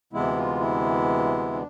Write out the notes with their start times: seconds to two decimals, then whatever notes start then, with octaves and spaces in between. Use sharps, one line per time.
0.13 D2 C3 E3 G#3 B3 E4
0.37 F4
0.60 E4
1.53 D4